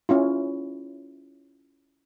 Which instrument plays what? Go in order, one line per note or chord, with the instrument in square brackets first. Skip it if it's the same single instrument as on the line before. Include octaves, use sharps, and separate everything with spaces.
[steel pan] C#4 E4 F4